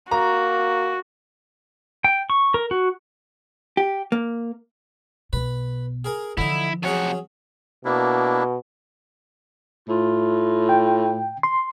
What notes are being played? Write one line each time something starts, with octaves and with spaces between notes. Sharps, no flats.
A#3 F#4 A#5
G5
C#6
A#4
F#4
G4
A#3
B1 B2 B4
G#4 A#4 G#5
D3 E3 F3 D#4 E4
C3 F#3 C#4 G#4 F#5
B2 A#3 D4 E4
A2 F4
G5
C6